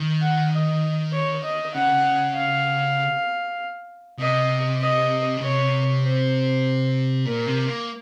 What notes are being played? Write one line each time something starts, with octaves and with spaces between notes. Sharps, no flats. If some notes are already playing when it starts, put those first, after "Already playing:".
Already playing: D#3
F#5
D#5
C#5
D#5
C#3 F#5
F5
C3 D#5
D#5
C#3
C3 C#5
C5
A#2 A#4
C3
A#3